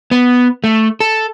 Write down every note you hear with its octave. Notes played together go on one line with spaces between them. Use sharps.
B3
A3
A4